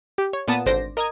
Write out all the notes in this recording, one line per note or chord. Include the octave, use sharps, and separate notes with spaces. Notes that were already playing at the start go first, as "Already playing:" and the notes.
G4
C#5
A#2 B3 A5 D#6
G#1 D3 C5 D6 A#6
A#4 D#5 A#5 D#6 G#6